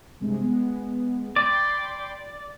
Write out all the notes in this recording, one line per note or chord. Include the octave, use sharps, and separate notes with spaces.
G2 C3 G#3
G#3 B3
D5 G5 B5 C6